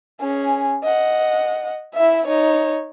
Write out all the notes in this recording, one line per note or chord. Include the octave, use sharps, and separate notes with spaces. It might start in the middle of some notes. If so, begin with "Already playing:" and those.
C#4 G#4
D#5 F#5
E4 E5
D#4 C#5